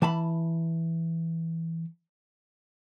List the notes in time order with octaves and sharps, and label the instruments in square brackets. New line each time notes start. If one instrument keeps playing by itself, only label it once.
[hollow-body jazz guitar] E3 A5 B5